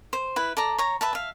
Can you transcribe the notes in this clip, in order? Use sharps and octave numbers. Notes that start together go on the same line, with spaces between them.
C5
E4 B4
A4 D5 A#5
C#5 A#5
B4 E5 A5
E5 F5